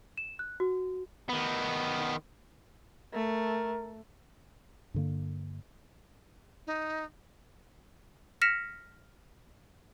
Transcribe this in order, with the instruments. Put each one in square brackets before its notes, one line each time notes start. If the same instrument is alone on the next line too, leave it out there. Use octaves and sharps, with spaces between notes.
[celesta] E7
F#6
F#4
[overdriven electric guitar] D#3 B3
[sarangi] A3 [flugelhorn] A#4
[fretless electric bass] G2 D3 A#3
[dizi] D#4
[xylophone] F6 A#6 B6 C#7 E7 F7